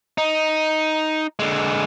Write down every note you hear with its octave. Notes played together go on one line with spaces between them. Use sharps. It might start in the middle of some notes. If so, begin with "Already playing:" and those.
D#4
D3 G#3